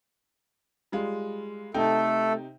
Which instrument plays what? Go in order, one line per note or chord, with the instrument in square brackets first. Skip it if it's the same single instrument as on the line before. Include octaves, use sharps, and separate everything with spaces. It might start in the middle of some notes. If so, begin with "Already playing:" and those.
[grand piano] G3 G#3 F4
[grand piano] C3 D#4 G5 [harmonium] A3 A4